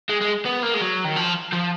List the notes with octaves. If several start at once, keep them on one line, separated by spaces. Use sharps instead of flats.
G#3
G#3
B3
A#3
G#3
F#3
D#3
F3
F3